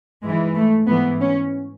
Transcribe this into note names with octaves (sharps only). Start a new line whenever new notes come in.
G#2 E3 G#3
A3
G#2 E3 B3
C#4